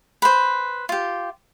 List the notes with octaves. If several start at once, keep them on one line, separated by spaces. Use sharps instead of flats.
B4 C5
F4 G4